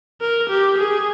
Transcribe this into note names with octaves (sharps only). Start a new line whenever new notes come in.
A#4
G4
G#4